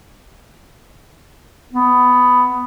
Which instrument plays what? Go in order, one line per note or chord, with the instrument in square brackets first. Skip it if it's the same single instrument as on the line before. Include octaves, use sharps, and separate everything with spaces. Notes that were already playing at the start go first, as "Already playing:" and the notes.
[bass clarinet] B3